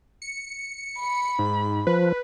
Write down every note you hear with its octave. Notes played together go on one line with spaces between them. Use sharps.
C#7
B5
G#2
F3 B4